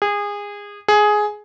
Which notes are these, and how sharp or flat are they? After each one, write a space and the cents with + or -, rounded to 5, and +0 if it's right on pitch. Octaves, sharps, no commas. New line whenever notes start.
G#4 -25
G#4 +10